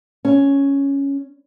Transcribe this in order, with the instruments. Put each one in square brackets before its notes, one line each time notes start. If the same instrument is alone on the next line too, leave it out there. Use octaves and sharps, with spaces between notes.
[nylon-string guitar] C#4